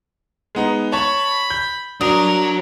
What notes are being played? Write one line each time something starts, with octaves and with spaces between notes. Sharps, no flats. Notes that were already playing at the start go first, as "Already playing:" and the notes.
G#3 B3 D#4
C#5 A5 B5 C#6
G6
F#3 D4 A#4 D#6